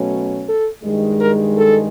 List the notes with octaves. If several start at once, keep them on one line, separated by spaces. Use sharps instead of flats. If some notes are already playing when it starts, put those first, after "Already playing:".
Already playing: B2 F#3 A3 C#4
A4
G2 D#3 G#3
A#4
A4